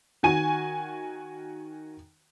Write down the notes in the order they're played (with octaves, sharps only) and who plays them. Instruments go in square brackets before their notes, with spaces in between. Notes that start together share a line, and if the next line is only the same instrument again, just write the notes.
[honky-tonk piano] D#3 F#4 G#5 D#7